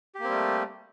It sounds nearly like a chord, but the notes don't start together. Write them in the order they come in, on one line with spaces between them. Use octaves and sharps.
G4 A#3 C4 G3 A3